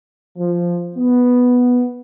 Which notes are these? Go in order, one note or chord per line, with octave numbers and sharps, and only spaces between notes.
F3
B3